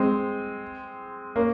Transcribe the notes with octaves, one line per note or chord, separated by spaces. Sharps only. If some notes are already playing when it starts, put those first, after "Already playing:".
Already playing: G#3 C4
A#3 C#4